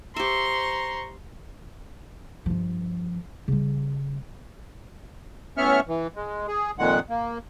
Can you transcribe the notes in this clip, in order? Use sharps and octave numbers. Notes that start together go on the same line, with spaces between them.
G4 C5 E5 A#5 C6 C#6
G2 F3
C#3 G3
A2 B3 C#4 E5 C#6 F6
E3
G#3
G#4
F2 A#2 D#3 G#3 F#5
A#3